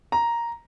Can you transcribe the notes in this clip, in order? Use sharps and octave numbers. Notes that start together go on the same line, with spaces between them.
A#5